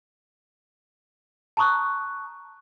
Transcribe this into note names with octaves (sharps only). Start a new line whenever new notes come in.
A5 A#5 C#6 D#6 F#6